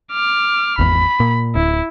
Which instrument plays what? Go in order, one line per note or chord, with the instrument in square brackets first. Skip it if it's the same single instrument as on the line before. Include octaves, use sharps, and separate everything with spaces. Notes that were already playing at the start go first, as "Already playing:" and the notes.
[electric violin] D6 F6
[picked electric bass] G#1 E2 [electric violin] B5
[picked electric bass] A#2
[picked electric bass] D1 [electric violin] E4